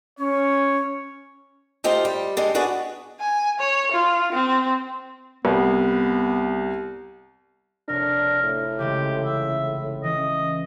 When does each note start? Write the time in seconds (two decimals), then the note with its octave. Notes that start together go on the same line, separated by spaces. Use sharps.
0.19 C#4 C#5
1.84 A3 D#4 F4 G4 C5 F5
2.05 G3
2.37 D3 G#3 G4
2.55 B3 D4 F#4 G#4 B4
3.20 G#5
3.59 C#5
3.91 F4
4.32 C4
5.45 C2 B3
7.89 F1 D4 A#4 C#5
8.43 A2
8.79 A1 C#3 G#3 G4
9.23 E5
10.04 E3 C#4 D#5